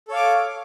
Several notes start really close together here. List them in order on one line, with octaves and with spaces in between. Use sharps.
A4 C#5 F5 D6